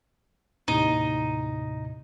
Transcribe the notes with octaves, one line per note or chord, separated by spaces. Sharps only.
D#2 A2 C3 D#4